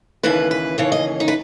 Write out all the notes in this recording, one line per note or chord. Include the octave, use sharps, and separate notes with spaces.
D#2 C#3 E3 B4
B4
D#2 C#3 E3 C#5
D#5
D#4
B4